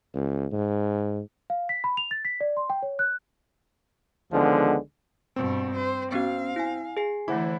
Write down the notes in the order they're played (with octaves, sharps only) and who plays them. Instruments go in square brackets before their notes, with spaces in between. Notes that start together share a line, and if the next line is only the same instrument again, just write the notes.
[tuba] C#2
G#2
[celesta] F5
B6
B5
F7
A6
B6
D5
C6
G5
C#5
F#6
[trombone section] C#2 D3 D#3 F3 G#3 B3
[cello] G2 B2 [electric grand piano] C4
[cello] C5
[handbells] B3 C#4 F#4 [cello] F5
[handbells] E4 G#5
G#4 G#5 C7
[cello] D3 E3 [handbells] A3 D6 [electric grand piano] E4 C5 F#5